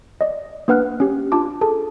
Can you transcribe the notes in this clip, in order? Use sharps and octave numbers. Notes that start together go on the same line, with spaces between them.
D5 D#5
A#3 D4 B4 F#5 F6 F#6
C#4 G4
D4 F4 A5 D6
G#4 A4 A5